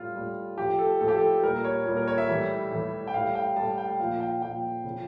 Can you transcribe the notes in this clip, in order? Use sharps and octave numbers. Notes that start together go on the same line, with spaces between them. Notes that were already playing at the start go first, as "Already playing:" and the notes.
Already playing: A2 G3 F4
A2 G3
A2 F3 G4
A4
A2 F3 A4
G4
A4
A#2 G3 A#4
C#5
A#2 G3
A#4
C#5
E5
A2 E3 G3
A2 E3 G3
G5
A2 G3 F5
G5
A2 G3 A5
G5
A#2 F3 F5
G5
A#2 F3 G5
C#3 F3